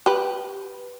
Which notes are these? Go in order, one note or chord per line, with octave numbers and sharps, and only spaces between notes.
G4 B4